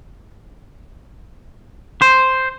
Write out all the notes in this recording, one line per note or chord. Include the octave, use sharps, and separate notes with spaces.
C5